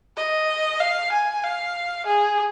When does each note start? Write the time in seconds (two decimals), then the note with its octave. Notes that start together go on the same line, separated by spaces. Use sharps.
0.17 D#5
0.80 F5
1.12 G#5
1.43 F5
2.07 G#4